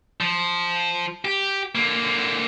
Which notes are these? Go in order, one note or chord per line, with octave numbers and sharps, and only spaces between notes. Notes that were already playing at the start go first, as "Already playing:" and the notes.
F3
G4
D3 A#3